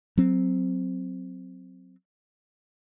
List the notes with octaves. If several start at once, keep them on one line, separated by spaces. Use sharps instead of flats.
F#3 C4